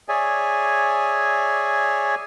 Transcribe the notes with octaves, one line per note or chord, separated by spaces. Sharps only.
G#4 C#5 D5 E5 G#5